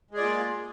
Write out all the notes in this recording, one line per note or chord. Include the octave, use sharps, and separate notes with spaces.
G#3 A#3 F4 G#4 D5